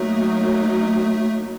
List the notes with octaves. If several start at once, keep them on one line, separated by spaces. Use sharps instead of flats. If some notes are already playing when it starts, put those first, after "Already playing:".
Already playing: F#3 A3 A#3 D#4